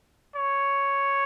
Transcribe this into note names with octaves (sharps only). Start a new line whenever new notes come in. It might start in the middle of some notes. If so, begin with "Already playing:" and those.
C#5